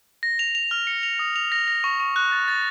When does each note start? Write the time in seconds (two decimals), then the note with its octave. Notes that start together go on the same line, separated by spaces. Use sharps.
0.23 A#6
0.39 F7
0.55 F7
0.71 F6
0.87 C#7
1.03 F7
1.19 D#6
1.36 F7
1.52 A#6
1.68 A#6
1.84 C#6
2.00 C#6
2.16 F#6
2.32 A6
2.48 A6